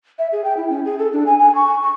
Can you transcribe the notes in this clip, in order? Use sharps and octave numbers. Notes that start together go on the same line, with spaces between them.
E5
G#4
G5
E4
C#4
G#4
A4
D4
G#5
G#5
C#6
C#6